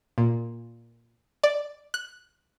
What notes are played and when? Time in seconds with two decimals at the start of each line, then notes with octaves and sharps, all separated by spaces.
0.18 A#2
1.43 D5
1.94 F#6